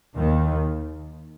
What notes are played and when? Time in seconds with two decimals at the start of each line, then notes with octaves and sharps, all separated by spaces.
0.15 D#2 D#3